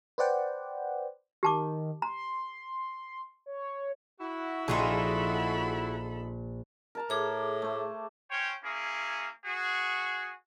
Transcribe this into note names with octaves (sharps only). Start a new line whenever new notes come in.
B4 C5 D5 F#5 G5
D#3 G4 A5 D6
A#5 C6
C#5
E4 F#4
A#1 D#4 F4 G#4 A4 B5
A#4 A5 A#5
A2 G#4 D6
A3 C5
C#4 C5 C#5 G5
A#3 C#4 E4 G#4
F#4 G#4